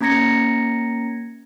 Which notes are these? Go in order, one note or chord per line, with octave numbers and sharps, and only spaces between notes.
A#3 C#4 A#5 G#6 A#6 C#7